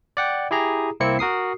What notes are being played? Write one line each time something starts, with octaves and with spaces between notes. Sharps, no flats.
D5 F#5 G5
E4 G4 G#4 A#5
C2 A#3 C4 E4 C#7
F#4 A#4 D#6 C7